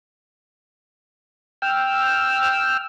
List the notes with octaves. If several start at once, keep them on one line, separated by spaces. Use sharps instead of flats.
G5 E6 F6